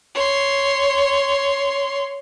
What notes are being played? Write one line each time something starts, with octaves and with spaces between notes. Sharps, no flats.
C#5 C6